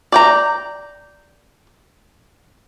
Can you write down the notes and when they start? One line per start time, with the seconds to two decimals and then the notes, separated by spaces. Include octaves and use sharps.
0.12 D5 G5 A#5